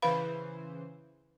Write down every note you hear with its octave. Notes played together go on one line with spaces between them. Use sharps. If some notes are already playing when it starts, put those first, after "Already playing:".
C#3 E3 B4 C5 F5 B5